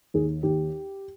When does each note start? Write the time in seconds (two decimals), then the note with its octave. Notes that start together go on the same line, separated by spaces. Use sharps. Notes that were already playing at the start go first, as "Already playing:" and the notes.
0.14 D#2 G#4
0.43 D#2 G4